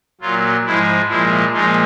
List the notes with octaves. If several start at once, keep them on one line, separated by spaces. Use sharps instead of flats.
A#2 F#3 F4
G#2 F3 G#3 E4
A#2 F3 G#3 E4
A#2 F3 G#3 D#4